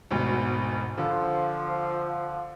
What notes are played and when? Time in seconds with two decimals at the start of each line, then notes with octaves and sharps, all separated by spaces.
0.11 G#1 D2 B2
0.98 D3 F3